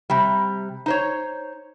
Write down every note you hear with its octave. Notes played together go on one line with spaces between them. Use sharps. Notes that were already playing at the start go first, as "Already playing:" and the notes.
C3 G3
D#4 C5 C#5